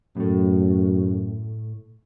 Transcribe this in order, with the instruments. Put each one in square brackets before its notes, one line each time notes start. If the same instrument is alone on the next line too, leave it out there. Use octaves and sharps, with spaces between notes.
[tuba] F#2 [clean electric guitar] A2 A3